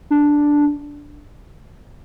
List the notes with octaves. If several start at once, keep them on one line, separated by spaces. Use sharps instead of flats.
D4